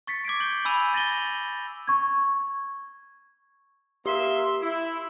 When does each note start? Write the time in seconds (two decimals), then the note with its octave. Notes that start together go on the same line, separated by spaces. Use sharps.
0.07 C#6 A6 B6 C#7
0.25 D6 G#6 C7 D7
0.40 G6 F#7 G7
0.65 G#5 B5 E6 D#7 F7
0.94 A6 A#6 D#7 F#7 G7
1.87 C#6 G#6
4.06 A#3 G4 E5 C6
4.61 E4